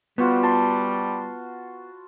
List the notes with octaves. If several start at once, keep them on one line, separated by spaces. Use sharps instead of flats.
G3 B3 F4 F#4 C5
A5 B5 C6